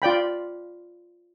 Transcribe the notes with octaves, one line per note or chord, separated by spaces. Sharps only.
F4 D5 G5 B5